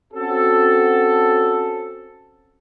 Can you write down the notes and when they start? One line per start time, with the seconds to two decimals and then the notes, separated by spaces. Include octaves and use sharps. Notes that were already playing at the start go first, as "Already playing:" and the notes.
0.12 C4 C#4 F#4 A4